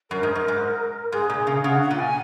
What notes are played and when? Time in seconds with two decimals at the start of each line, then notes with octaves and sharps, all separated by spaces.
0.11 F#2 A#4
0.23 G#2
0.35 F#2
0.48 G#2
1.12 G#2 G#4
1.29 A#2
1.47 C#3
1.64 C#3 F#5
1.82 F#5
1.91 A#2
1.99 G#5